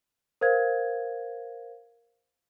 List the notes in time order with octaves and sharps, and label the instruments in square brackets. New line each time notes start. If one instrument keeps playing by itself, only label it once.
[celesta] A#4 C5 F5 G#6